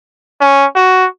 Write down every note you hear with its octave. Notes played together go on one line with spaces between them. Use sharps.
C#4
F#4